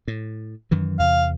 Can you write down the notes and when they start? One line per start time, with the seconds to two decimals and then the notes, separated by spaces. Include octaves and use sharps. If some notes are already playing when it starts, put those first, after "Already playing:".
0.08 A2
0.71 F#2 D#3 E3
0.99 E2 C3 F5